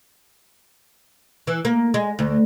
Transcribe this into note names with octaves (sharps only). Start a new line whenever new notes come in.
E3
A#3
G#3
D2